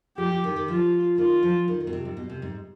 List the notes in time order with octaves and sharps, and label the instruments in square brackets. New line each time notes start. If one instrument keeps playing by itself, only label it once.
[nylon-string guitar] F3 [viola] G4
[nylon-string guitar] F3
D#3
D#3
[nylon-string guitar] F3 [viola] F4
[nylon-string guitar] D#3 [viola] F4
[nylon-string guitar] F3
D#3
D#3
B2
C3
G#2
B2
C3
G#2